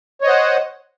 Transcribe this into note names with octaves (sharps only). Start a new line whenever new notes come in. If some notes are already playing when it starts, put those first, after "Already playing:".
C5 C#5 D#5 F#5